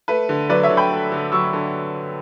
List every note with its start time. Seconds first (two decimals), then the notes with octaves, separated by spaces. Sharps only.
0.08 A3 B4
0.29 D3
0.49 F#3 B4 D5
0.63 C#5 E5
0.70 D3
0.77 G5 B5
0.91 A3
1.12 D3
1.32 F#3 C#6 E6
1.53 D3